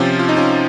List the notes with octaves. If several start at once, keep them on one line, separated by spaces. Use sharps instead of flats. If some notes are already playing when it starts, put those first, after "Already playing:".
Already playing: C3 F3 C#4 F4
F4
D#4
C#4 F4